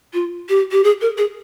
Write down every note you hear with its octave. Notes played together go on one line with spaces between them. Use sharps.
F4
G4
G4
G#4
A#4
G#4